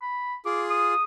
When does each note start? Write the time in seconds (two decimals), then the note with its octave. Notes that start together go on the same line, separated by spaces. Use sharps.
0.02 B5
0.46 F4 G#4 D6
0.70 D#6